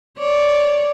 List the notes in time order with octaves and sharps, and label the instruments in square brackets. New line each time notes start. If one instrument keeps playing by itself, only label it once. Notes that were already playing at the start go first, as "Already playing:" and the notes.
[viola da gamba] C#5 D5